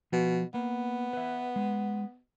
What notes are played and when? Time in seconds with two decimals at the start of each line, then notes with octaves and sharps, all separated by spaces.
0.12 B2 F3
0.54 A#3 B3
1.13 B4 E5
1.56 G#3